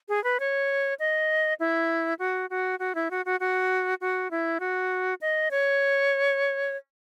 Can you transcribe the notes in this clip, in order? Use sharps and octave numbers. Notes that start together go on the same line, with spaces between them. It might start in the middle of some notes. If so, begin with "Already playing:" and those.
G#4
B4
C#5
D#5
E4
F#4
F#4
F#4
E4
F#4
F#4
F#4
F#4
E4
F#4
D#5
C#5